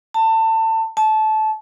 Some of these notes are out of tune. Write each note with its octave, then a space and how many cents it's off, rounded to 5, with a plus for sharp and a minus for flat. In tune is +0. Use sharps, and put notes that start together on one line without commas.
A5 +25
A5 -20